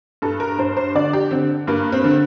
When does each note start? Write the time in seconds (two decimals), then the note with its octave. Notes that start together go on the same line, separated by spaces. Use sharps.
0.22 G2 A4
0.40 A#4
0.59 G2 C5
0.77 C5
0.95 D3 D5
1.13 G4
1.31 D3 C4
1.67 G2 A#3
1.92 C4
2.04 D3